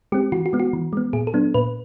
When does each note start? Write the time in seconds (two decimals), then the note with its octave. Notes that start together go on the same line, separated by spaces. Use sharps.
0.12 G#3 C4 G4
0.32 E3 F#4
0.46 F#4
0.53 G#3 B3
0.60 F#4
0.73 E3
0.93 G#3 B3
1.13 A#2 G#4
1.27 A4
1.34 F#3 B3 D4
1.54 A#2 B4